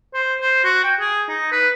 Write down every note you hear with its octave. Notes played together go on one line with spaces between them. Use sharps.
C5
C5
F#4
G5
G#4
D#4
B4